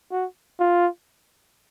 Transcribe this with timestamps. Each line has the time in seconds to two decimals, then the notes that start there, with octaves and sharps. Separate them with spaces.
0.11 F#4
0.59 F4